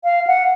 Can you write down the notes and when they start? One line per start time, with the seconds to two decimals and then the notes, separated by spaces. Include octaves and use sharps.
0.04 F5
0.27 F#5